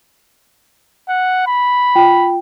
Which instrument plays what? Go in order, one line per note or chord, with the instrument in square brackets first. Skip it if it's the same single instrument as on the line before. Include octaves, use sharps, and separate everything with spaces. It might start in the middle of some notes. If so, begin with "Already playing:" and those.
[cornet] F#5
B5
[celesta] F4 G5